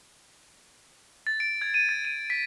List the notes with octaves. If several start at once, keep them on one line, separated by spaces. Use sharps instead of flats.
A6
D7
G#6
D#7
A6
D#7
B6